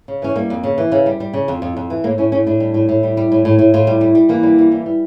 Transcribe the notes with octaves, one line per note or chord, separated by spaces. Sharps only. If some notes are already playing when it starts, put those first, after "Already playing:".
C#3
E3 C#4
G3 A#3
F2
C#3
E3
C#3
G3
G3
C#3
F2
F2
F2
E3
A2 A#3
A2 C#4
A2 C#4
A2 D4
G3
A2
A2
G3
G3
A2
A2
A2
A2 F4
G3
G3
G3
E3 A#3
G3
E3
G3
G3